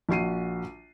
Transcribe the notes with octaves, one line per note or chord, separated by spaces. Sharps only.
A#1 F#4 C7 D#7